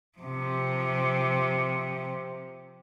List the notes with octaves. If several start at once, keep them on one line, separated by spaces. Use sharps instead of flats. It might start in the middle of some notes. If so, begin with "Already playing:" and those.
C3 F3